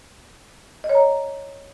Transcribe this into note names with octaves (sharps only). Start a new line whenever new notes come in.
D#5
C#5
A#5